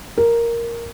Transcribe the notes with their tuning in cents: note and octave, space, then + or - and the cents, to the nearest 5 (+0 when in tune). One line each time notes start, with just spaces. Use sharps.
A#4 +0